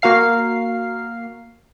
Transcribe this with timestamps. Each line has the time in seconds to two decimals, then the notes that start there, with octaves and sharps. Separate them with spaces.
0.02 A#3 F#4 A#4 F5 C7